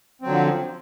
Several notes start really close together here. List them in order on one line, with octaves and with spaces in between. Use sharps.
C4 F#3 D3 F3